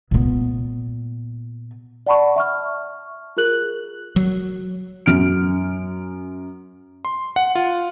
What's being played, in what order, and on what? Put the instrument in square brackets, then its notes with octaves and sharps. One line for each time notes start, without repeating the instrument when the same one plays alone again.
[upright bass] A#2 B3
[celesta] D5 F#5 A5 B5 C#6
E5 C#6 F6
F4 G#4 A#4 F#6 F#7
[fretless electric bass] F#3
[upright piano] F#2 F6 D7
[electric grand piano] C6
F#5
F4